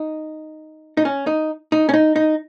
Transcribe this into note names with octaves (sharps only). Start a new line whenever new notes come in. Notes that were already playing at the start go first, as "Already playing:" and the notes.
Already playing: D#4
D#4
C#4
D#4
D#4
C#4
D#4
D#4